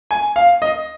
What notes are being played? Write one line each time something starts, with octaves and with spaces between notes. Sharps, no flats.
G#5
F5
D#5